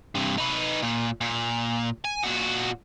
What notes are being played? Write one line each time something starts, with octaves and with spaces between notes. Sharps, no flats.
G2 C3
D#4 B4
A#2
A#2
G#5
A#2 F#4